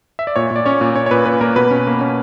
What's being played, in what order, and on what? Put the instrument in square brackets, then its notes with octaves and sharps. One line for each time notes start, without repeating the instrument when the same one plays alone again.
[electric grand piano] E5
D5
A#2 C#5
A#2
D5
C#4 C#5
A#2
C#4 C#5
C#5
A#2 B4
A#2 B4
A#3 A#4
B2 B4
C#4
A#3
C#4